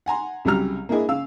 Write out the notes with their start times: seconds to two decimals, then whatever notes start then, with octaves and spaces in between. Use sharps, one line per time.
0.06 F#5 G#5 A#5 C6
0.45 C2 C#3 F#3 G3 A#5 F6
0.89 A#3 D4 E4 G#4 D#5
1.09 C#3 F5 E6